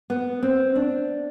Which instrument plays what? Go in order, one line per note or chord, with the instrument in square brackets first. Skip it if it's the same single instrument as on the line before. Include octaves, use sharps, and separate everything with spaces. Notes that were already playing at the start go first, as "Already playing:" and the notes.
[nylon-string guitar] B3
C4
D4